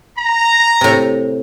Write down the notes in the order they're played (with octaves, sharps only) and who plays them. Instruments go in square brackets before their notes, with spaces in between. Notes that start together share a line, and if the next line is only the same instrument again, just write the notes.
[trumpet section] A#5
[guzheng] A2 C3